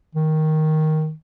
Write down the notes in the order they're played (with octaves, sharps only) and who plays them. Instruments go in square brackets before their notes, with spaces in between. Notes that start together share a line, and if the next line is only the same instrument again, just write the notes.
[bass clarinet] D#3